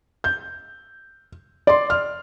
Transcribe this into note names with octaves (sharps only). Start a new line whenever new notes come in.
G6
D5 C6
F6